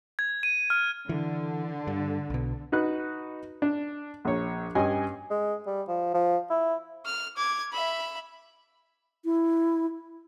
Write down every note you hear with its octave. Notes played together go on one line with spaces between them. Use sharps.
G#6
D#7
F6
D3 E3
G2
B1 B2
D#4 F#4 B4 F#6
D4
A#1 C#5
G2 C#4 D#5 G#5
G#3
G3
F3
F3
E4
F6
D6 G#6
E5 B5
E4